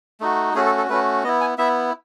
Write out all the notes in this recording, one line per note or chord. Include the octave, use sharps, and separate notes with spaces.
A3 D#4 F#4
A3 C#4 F#4 G#4
A4
A4
A3 C#4 F#4 B4
B3 E4 D#5
G#5
B3 E4 E5